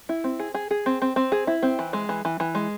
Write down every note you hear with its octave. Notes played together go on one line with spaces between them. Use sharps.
E4
C4
G#4
G#4
G#4
C4
C4
C4
G#4
E4
C4
E3
G#3
E3
E3
E3
G#3